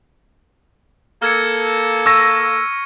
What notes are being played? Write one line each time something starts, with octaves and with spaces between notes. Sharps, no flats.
A#3 A4 F6 G#6 C#7
C#6 E6 A#6